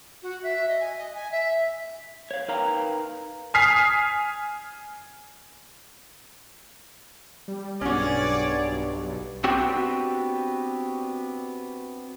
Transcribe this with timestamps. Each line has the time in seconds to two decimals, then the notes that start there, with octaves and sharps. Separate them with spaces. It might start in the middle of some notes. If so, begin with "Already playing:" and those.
0.22 F#4
0.43 E5
0.68 D#5
0.80 G#5
0.97 D#5
1.14 G#5
1.31 E5
2.31 C#5 F5
2.48 D#4 A#4 B4 F5 G5 A#5
3.54 G#5 D#6 F6 B6 C7
7.48 G3
7.81 B1 G2 C#4 F#4 G#4 C#5 D5
9.44 B3 C4 D4 F#4 G4